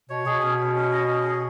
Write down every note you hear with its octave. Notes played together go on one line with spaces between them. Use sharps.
B2 C#5
B2 G#4
C#4
C#4
C#4
D#5
C#4
G#4